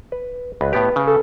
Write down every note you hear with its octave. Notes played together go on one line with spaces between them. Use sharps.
B4
C#2 B4
A2 B3 G4
C#3
A4